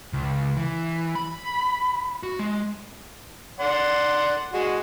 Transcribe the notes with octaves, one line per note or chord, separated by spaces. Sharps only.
C#2
E3
B5
F#4
G#3
D5 F#5 C6
G#3 F#4